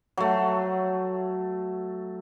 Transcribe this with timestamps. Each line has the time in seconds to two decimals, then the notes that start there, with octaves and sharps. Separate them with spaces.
0.17 F#3 A3